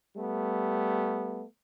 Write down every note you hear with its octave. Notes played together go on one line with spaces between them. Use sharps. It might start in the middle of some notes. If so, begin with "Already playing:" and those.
G3 A3 B3